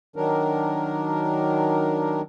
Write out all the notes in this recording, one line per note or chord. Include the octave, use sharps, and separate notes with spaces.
D#3 F#3 D4 A#4